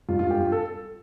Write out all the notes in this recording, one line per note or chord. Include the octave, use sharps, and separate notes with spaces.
G2 F4
G2 F4
G4
G2 F4
A4